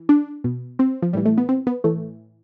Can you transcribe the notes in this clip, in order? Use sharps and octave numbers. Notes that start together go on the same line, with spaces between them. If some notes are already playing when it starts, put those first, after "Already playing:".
Already playing: E3
D4
B2
C4
F3
A2 E3 G3
A3
B3
C4
B3
A2 E3 A3